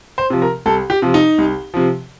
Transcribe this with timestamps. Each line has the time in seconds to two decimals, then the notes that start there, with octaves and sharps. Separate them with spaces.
0.18 C5
0.30 C3 F3
0.42 A#4
0.66 C2 A4
0.90 G4
1.02 C3 F3
1.14 D#4
1.38 C2
1.74 C3 F3